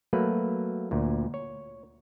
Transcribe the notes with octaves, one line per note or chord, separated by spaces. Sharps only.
F#3 A3 A#3 B4
D2 A#2
C#5